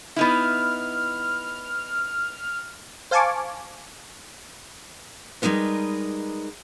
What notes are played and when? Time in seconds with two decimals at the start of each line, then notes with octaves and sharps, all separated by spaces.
0.16 B3 D#4 E4 F6
3.11 C5 F5 G#5 A5 C#6 D6
5.42 G3 G#3 D#4 A#4 B4